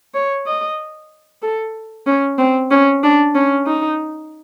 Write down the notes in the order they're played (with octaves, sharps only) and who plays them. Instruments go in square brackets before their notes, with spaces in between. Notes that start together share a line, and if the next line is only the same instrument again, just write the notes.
[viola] C#5
D#5
A4
C#4
C4
C#4
D4
C#4
D#4